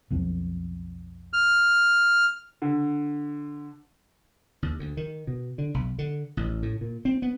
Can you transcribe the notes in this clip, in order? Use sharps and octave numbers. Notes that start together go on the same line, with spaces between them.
B1 F2 F3
F6
D3
D#2
D2
D#3
B2
D3
B1
D3
A1
A2
A#2
C4
B3